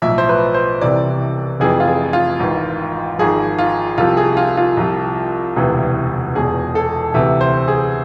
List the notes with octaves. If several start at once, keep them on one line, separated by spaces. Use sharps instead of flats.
B1 A2 F3 E5
C5
B4
C5
C2 C3 E3 D5
F1 F2 E3 G#4
F4
G#4
F4
G#1 G#2 E3
G#1 G#2 F3 G#4
F4
C2 C3 F3 F4
G#4
F4
F4
C2 C3 F3
E1 D2 C3 E3
E1 E2 B2 G#4
A4
D2 C3 E3 E5
C5
G#4